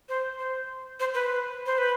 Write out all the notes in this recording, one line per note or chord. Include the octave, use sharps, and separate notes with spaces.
C5
C5
C5
B4
C5
B4